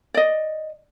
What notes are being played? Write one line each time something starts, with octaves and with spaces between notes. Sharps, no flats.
D5 D#5